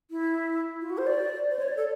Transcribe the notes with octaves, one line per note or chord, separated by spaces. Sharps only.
E4
F4
F#4
C5
D5
C5
C#5
D5
A4